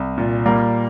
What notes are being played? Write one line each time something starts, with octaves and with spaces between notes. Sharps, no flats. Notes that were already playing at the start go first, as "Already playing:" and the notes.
Already playing: C2
A#2
G3 A#3